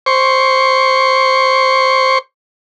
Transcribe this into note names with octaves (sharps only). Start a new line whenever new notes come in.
C5 C#6